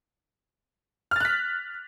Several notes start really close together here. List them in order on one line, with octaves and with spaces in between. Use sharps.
F6 A6 F#6 B6